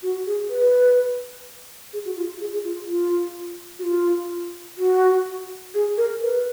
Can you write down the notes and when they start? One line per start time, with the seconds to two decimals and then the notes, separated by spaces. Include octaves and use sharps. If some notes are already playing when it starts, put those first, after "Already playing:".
0.03 F#4
0.26 G#4
0.50 B4
1.93 G#4
2.05 F#4
2.17 F4
2.41 G#4
2.53 G#4
2.64 F4
2.88 F4
3.79 F#4
3.83 F4
4.78 F#4
5.74 G#4
5.97 A#4
6.22 B4